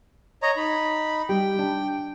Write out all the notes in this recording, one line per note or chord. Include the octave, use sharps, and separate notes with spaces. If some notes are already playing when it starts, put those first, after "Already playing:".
C#5 D#5 A#5
D#4 B5
G3 G5
D4